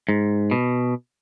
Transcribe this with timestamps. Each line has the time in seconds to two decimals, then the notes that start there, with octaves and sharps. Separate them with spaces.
0.09 G#2
0.51 B2